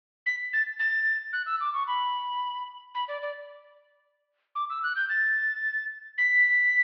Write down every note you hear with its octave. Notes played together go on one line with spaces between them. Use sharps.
B6
A6
A6
F#6
E6
D6
C#6
B5
B5
D5
D5
D6
E6
F#6
G6
A6
B6